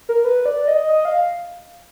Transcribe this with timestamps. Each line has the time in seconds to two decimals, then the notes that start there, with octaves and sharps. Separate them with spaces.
0.09 A#4
0.25 B4
0.46 D5
0.68 D#5
0.89 D#5
1.05 F5